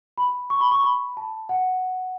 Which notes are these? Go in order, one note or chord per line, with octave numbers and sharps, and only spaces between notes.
B5
C#6
B5
C#6
B5
A5
F#5